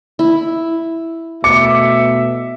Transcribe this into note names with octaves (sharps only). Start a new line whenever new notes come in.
E4
B2 A3 E5 D6 C#7